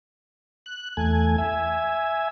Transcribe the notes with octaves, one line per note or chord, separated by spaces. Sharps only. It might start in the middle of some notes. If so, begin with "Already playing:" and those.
F#6
E2 A3 G#5
E5 G#5